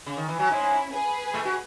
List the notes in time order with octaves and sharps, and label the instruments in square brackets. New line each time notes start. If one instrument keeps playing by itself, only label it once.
[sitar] C#3
D#3
E3
F#3
[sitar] G#2 G#3 [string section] C#4 E4
[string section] G#4 B4
[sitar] A2 A3
F#4